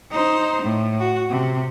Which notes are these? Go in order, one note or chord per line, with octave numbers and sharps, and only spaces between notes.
D#4 C5
A2
F#4
C3